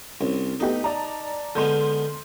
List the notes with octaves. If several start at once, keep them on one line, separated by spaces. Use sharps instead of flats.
C2 C#4
A3 B3 D#4 G4
D5 A5 A#5
D3 G#3 B3 C6 F6 G6